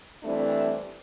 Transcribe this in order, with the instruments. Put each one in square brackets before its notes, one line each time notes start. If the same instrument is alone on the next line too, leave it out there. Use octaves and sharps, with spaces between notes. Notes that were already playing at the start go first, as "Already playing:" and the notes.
[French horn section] E3 G3 A3 C4 D4